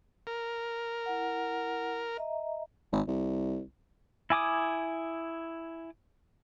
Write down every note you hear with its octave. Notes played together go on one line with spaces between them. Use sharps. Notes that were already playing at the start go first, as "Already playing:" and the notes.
A#4
E4 F#5
D#5 E5 A#5
G#1
C2
E4 G#5 D6 D#6